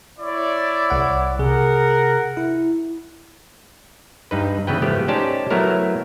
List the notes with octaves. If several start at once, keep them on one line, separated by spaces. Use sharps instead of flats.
E4 C#5 D5
C2 F#5
C3 G#4 A#4 F#5
E4
G2 D#4 B4
C#3 E3 B3 B4 G5
G#2 F3 A3 B3 G4
C#4 D#4 G4 C5 D5 A5
F#3 A3 B3 E4 A#4 C#5